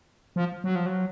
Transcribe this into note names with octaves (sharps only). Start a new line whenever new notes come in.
F3
F#3
F3
F#3